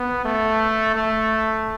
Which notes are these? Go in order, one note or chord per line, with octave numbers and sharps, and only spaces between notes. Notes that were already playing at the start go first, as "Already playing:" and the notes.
Already playing: B3
A3
A3